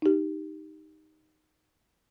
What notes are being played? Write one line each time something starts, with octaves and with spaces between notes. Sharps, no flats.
D#4 G4